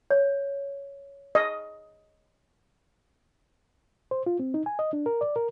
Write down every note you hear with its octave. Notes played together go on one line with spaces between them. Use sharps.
C#5
D#5
C5
F4
C4
D#4
G#5
D#5
D4
A#4
D5
A#4